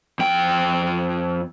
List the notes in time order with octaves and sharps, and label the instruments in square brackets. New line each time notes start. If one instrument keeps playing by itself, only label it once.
[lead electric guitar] F2 G5